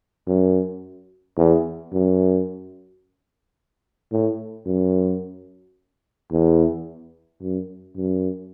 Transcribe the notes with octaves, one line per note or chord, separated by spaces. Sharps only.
F#2
E2
F#2
A2
F#2
E2
F#2
F#2